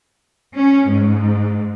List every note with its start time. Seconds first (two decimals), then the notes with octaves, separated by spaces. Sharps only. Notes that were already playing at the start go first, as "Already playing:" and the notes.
0.56 C#4
0.89 G#2